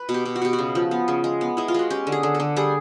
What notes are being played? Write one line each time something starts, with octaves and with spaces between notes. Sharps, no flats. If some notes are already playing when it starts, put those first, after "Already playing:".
Already playing: B4
B2
G4
B2
F#4
B2 G4
F#4
C#3
F3
B3
C#3
G#3
B3
G#3 E4
F4
G#3 F#4
C#4 G4
D3
G#4
D3
A4
D3
G3 G#4